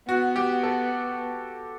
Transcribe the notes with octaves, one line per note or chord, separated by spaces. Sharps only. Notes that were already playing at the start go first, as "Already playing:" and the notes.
B3 F#4
G4
A4